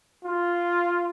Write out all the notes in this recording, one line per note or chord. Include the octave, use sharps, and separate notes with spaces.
F4